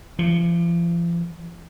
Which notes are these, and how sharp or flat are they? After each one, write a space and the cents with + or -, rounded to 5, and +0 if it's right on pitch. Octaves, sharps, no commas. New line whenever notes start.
F3 -40